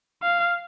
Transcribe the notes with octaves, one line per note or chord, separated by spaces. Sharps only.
F5